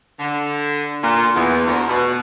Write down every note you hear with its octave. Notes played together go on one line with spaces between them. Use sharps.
D3
A#2
E2
D2
B2